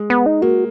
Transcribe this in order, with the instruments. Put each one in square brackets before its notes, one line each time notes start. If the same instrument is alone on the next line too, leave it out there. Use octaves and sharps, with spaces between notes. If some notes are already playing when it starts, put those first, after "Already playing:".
Already playing: [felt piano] G#3
[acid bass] B3
D#4
[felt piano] A#3 [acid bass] F#4